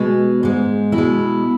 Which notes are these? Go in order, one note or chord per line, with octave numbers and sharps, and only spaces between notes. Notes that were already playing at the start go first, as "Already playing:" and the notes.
Already playing: B2 G#3
G#2 G#3
B2 E4
G#3